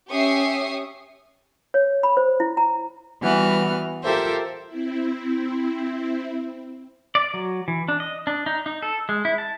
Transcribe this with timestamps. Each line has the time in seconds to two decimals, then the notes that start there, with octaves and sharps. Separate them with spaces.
0.10 C#4 G4 E5 C#6 D#6 C7
1.74 C#5
2.03 B5
2.17 C5
2.40 E4
2.57 A#5
3.22 E3 G3 B3 F#4 F6
4.03 F4 G4 A4 A#4 C5 E5
4.67 C4 E4
7.15 D5
7.34 F#3
7.68 E3
7.88 D4
8.00 D#5
8.27 D4
8.46 D#4
8.66 D#4
8.82 A4
9.09 G#3
9.25 E4
9.38 A5